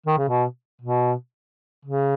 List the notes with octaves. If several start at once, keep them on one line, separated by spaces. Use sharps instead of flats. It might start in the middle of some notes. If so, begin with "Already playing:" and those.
D#3
C#3
B2
B2
C#3